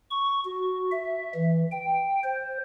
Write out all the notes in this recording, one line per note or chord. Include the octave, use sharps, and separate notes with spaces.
C#6
F#4
E5
E3
G5
C5